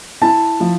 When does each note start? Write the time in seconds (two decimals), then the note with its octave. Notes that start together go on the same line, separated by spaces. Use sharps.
0.22 E4 A5
0.60 F3